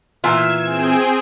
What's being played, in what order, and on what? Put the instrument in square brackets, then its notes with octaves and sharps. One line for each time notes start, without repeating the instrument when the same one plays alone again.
[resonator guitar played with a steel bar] A#2 E3 F4 [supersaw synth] G#6 E7
[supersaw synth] C4 G#4 G5